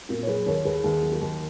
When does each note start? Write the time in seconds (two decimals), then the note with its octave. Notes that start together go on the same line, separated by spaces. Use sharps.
0.09 A#2 F#4 A#4
0.23 C#5
0.27 F#3 G#4 B4
0.46 D#2 A#4 C#5
0.65 D#2 G#4 B4
0.84 D#2 G#4
1.03 F#3
1.12 F#4 A#4
1.21 D#2